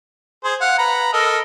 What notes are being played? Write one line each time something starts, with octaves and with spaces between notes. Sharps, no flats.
G#4 C5
F5 F#5
B4 A#5
A4 A#4 D#5